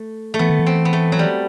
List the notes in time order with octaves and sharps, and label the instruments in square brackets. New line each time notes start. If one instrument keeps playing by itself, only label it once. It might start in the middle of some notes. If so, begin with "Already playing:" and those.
Already playing: [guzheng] A3
A3
[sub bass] E3 [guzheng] B3
[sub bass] D#3
E3
[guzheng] C4
B3
A3
F#3
G3